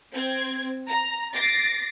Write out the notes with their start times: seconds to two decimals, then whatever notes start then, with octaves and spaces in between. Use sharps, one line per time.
0.12 C4 G#6
0.89 A#5
1.33 D6 A6 A#6 C7